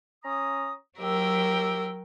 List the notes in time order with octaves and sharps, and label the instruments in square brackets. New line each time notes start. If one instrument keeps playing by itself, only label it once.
[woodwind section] C#4 A#5 D#6
[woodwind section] D#2 G4 E6 [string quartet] F#3 A#4 G5